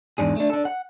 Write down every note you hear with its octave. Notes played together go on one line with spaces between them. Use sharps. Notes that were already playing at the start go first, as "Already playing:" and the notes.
E2 G#2 D4 G#4
A3 D4
D4 A4
F#5